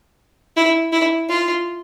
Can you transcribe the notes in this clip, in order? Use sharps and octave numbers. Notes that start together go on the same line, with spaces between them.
E4
E4
F4